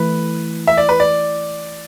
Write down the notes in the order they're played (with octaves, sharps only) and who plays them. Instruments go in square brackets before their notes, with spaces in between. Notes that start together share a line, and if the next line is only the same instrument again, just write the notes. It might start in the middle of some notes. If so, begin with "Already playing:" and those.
Already playing: [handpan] E3 A3 E4 [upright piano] B4
[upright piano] E5
D5
B4
D5